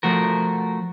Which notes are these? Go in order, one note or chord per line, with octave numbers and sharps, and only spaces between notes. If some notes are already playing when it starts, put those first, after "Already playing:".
F3 A3 F#4 A#4